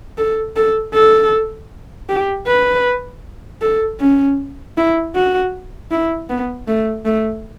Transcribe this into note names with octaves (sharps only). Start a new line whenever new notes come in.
A4
A4
A4
G4
B4
A4
C#4
E4
F#4
E4
B3
A3
A3